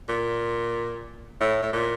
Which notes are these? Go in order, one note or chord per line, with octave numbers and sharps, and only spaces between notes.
A#2
A2
A2
A#2